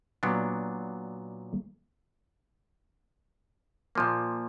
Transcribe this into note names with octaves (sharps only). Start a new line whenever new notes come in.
A#2 F#3 B3 D4
A#2 F3 A#3